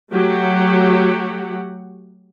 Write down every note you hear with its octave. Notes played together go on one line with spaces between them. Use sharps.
F#3 A3 F#4 G4 F#5